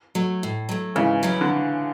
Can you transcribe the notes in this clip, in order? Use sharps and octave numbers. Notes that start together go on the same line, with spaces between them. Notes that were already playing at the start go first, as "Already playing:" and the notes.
F#3 A3
A2
F#3 A3
G#2 C#3 E3
F#3 C#4 E4
D3